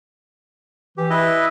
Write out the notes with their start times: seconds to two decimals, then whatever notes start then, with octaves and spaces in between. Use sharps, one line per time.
0.98 E3 G4
1.10 E4 B4 D#5